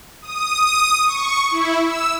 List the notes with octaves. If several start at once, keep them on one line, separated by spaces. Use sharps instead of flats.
D#6
C#6
E4
E6